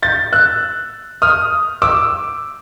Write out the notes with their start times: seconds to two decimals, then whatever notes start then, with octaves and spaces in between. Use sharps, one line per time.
0.02 G6 A6
0.33 E6 F#6
1.22 D#6 F6
1.82 D6 E6